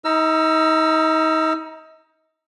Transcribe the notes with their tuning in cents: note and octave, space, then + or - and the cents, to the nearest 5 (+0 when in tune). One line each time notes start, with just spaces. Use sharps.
D#4 +35 A#5 +0 E6 +35